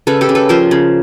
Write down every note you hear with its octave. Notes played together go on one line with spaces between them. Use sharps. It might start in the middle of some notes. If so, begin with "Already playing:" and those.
C#3 A4 B4
G4 A4
C#3
A4 B4
F3 A#4 C5
C#3